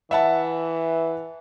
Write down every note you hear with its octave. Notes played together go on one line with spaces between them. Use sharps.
E3 E5 F#5 A5